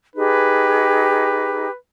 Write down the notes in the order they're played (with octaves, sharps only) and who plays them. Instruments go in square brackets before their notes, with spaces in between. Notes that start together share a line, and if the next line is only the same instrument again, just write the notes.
[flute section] D#4 G4 G#4 [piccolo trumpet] B4